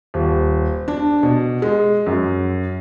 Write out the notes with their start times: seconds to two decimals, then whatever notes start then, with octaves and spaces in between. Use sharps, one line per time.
0.14 D#1
0.88 D4
1.23 B2
1.62 G#3
2.06 F#2